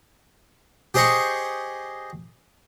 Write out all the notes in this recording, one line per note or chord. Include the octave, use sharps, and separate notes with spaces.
G4 G#4 C5 D#5 C#6